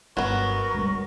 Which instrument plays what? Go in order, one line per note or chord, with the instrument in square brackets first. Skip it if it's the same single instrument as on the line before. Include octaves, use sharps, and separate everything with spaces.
[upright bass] G1 [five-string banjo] F#3 B3 [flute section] A#4 C#6
[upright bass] C#2 G3